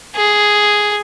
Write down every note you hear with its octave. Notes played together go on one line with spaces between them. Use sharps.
G#4